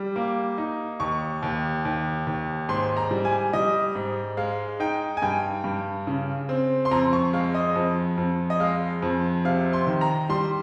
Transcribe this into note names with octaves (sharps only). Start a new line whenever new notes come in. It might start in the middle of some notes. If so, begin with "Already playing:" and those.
Already playing: G3
A#3
D#4
D#2 C#6
D#2
D#2
D#2
G#2 C6
A#5
G3
G#5
G3 D#5
G#2
G#3 F5
D#4 G5
G#5
G2 G5
G2
C#3
C4
C6
F2 A#5
C#6
G#3 F5
D#5
F2
F2
D#5
G#3 F5
F2
C3 F5
C6
D#3
A#5
G3 C6